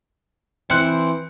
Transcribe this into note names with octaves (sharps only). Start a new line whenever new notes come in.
E3 C4 E4 C5 F#6 C#7